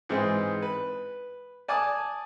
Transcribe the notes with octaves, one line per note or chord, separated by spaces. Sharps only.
G#2 E3 G#3 C4
B4
D5 G#5 A5 D6 D#6